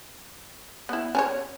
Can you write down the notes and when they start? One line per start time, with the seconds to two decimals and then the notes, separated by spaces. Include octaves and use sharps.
0.89 B3 E4
1.15 C#4 A#4 C#5